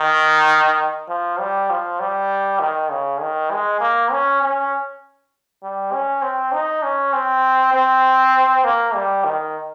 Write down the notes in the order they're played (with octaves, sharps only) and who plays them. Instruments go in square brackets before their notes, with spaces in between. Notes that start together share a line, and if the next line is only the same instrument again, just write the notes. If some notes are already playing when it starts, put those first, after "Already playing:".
Already playing: [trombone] D#3
F3
G3
F3
G3
D#3
C#3
D#3
G#3
A#3
C#4
C#4
G3
C#4
C4
D#4
C#4
C4
C4
A#3
G3
D#3